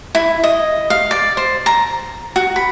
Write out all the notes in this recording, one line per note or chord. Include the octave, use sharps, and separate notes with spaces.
E4
D#5
F5
D5
C5
A#5
F#4
B5